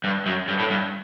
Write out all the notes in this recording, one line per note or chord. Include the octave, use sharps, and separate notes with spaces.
G2
F#2
G2
A2
G2